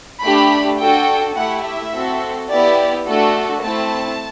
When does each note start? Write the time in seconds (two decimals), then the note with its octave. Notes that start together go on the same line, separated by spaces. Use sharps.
0.23 A3 D4 G4 B5
0.79 D4 F#4 A4 G5
1.36 A3 E4 G4 F#5
1.65 E5
1.93 C4 F#4 A4
2.50 B3 E4 G4 D5
3.07 A3 D4 F#4 A4
3.63 A3 C4 E4 A5